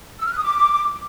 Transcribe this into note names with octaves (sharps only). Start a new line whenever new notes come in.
E6
F6
F#6
D#6
D6